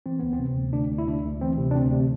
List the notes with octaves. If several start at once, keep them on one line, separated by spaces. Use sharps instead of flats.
E3 C4
D2 B3
C4
C3
D2
D2 D4
D2
E4
D2 D4
D2
E3 C4
C3
D4
D2 C4
C3